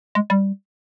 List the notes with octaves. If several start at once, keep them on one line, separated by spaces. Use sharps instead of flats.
G#3
G3